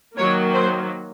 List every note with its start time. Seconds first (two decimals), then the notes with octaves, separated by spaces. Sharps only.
0.17 D#3 F#3 A#3 C#5
0.52 C5